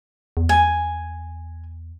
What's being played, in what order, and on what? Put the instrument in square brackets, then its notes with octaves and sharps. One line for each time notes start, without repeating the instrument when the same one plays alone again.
[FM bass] E2
[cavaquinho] G#5